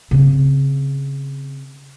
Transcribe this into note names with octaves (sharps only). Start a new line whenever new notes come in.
C#3 C4